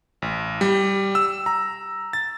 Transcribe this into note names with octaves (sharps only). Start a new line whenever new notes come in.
A1
G3
E6
A#5
A6